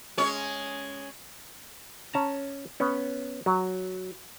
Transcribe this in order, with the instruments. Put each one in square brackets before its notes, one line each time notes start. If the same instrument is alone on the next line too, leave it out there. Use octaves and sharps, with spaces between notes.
[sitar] G#3 C#4 C#5
[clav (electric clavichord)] C#4 A5 A#5
B3 C#4
F#3